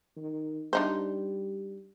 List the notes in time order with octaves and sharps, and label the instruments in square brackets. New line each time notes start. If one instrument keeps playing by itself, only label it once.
[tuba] D#3
[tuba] G3 [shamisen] D4 D#4 C5